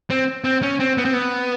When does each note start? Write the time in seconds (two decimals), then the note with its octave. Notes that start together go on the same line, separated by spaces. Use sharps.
0.10 C4
0.44 C4
0.63 C#4
0.80 C4
0.98 B3
1.05 C4
1.14 B3